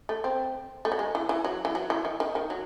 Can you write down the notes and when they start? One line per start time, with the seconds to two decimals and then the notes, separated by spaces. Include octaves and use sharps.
0.09 A3
0.24 C4
0.85 A3
0.92 F#3
0.99 G#3
1.15 E3
1.29 E3
1.45 F#3
1.65 E3
1.75 F#3
1.90 E3
2.05 D#3
2.20 D#3
2.35 D#3
2.50 F#3